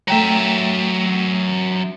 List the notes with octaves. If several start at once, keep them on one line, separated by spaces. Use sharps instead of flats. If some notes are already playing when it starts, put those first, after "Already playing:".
F#3 A3 E5 G5 A#5